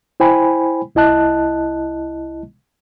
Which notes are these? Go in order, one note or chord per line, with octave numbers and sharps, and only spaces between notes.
E4 C5 G5 G#5 B5
C2 E4 D#5 A5 F#6